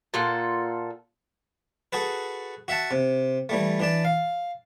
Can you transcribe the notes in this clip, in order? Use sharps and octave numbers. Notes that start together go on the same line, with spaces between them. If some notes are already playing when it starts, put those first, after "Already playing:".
A#2 F4 A4 F#5
F#4 G#4 A4 B4
F#4 E5 F#5 A5
C3
E3 G3 A3
E3 D4 A5
F5